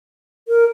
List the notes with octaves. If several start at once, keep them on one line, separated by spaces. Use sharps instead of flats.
A#4